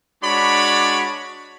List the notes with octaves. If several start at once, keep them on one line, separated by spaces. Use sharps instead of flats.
G#3 D4 F#4 C#5 D5 B5